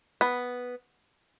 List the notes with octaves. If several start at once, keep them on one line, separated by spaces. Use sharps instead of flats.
B3